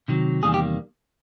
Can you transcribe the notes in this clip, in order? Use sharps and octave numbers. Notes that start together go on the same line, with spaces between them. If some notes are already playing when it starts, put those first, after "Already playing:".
C3 D#3 F#3
E2 C3 D#3 G3 A#3 G#4
G4